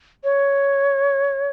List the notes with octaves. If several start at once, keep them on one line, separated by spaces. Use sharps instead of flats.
C#5